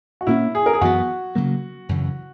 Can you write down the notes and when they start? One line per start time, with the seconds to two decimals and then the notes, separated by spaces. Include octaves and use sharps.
0.21 F#4
0.27 A#2 A#3 C#4 E4
0.55 G#4
0.66 A#4
0.74 G#4
0.81 F#2 E3 B3 F#4
1.35 C#3 F#3 A#3
1.89 F#2 C#3 E3